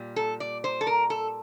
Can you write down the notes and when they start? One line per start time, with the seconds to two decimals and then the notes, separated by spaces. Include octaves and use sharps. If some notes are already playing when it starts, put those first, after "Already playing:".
Already playing: A#2 G3
0.16 A4
0.40 D5
0.64 C5
0.81 A4
0.87 A#4
1.10 A4